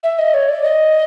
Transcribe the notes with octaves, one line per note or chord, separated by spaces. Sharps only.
E5
D#5
C#5
D5
D#5